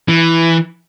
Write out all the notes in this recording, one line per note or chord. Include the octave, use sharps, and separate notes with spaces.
E3